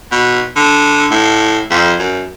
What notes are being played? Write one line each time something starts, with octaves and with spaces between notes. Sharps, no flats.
B2
D3
A2
F2
F#2